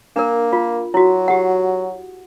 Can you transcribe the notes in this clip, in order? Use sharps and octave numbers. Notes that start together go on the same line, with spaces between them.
A#3 D4 A#4
F4
F#3 E4 F#4
G4 F#5